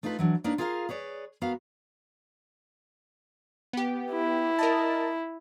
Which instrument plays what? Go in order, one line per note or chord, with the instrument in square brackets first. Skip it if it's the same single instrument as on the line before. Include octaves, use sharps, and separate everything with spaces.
[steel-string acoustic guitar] A3 D#4 F4 A#4 B4
E3 F#3 D4
A#3 D4 D#4 A#4 B4 C#5
F4 G#4 A#4 D5 F5
G#4 B4 C#5 D5
B3 F#4 A#4 F5
[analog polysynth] B3 G4
[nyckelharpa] E4
[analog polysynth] A#4 D#5 A5